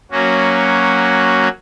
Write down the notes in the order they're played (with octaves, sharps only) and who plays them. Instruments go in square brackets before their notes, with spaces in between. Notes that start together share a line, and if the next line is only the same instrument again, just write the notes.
[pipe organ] F#3 A#3 C#4 F#4